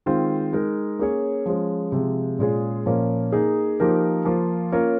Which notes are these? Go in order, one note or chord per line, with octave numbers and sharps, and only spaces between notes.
D#3 G#3 C4 F4 C5
G#3 D#4 A#4
A#3 C#4 G#4 C#5
F3 G#3 C#4
C3 F3 G#3
A#2 G#3 C#4 F4 G#4
A#2 F3 A#3 C#4
A#3 D#4 G#4
F3 A#3 D#4 G4 A#4
F3 A#3 F4
A#3 C#4 F4 A#4 C#5